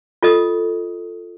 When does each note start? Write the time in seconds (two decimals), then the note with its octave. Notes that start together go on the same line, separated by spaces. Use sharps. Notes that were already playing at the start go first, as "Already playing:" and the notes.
0.23 F4 A4 D#5 D#6